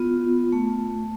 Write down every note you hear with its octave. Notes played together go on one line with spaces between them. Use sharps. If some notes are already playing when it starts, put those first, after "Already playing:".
Already playing: B3 F4
A3